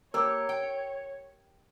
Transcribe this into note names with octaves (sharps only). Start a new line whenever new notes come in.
A#3 G4 A#4 C#5
G5